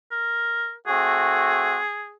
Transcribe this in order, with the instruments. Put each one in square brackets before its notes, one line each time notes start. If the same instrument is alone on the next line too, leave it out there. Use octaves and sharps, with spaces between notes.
[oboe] A#4
[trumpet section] A3 C4 F#4 [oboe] G#4